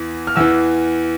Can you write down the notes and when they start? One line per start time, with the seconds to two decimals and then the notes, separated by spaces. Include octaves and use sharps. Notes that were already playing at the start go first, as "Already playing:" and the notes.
Already playing: E2 E3
0.27 F6
0.36 E2 E3 E6